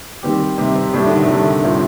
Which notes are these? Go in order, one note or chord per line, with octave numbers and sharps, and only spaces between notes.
D#3 G3 C4 G4
C3 D#3 G3 C4 G4
C3
A2 C3 G3 D4
D3
D#3
C3
A2 D3 G3 D4
A2 G3 C4 F4